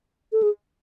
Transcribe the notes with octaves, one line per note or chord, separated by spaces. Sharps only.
A4
G#4